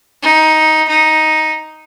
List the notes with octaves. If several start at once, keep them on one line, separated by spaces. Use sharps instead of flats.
D#4
D#4